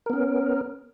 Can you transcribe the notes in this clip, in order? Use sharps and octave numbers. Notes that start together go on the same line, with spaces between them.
B3 C#4 A#4